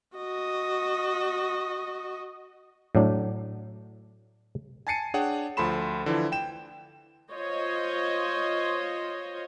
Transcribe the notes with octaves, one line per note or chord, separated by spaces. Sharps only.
F#4 D#5
A2 F#3 D4
G#5 A5 A6 C7 C#7 D#7
D4 G#4 C#5 F#5 G5
D2 F3 A4 B5 C6 E7
D3 E3 F3 E4
G5 E7
F4 C5 C#5 D#5